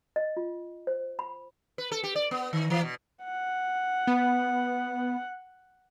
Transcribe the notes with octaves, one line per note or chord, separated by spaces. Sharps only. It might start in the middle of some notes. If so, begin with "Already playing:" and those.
D#5
F4
C5
B5
B4
A4
G4
D5
B3
D#3
E3
B2
F#5
B3